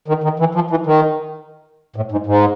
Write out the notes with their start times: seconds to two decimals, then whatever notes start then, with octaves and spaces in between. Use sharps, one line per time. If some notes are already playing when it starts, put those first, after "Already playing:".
0.08 D#3
0.24 D#3
0.40 E3
0.55 F3
0.70 E3
0.86 D#3
1.96 A2
2.12 G#2
2.27 G#2